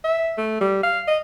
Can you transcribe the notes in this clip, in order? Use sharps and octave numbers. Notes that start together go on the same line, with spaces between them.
E5
A3
G3
F5
D#5